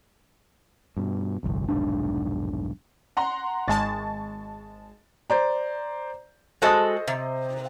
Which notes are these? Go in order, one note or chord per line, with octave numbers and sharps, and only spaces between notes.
G2 B2
G1 C2 F2
F1 B1 G#2 D4
F#5 A#5 C6
G#1 G#3 A5 C#6 A6
C5 D5 A#5
G#3 F#4 A4 C5 D#5 D#6
C3